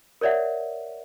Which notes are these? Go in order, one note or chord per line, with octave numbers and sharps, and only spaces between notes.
A#4 C#5 D5 E5 F#5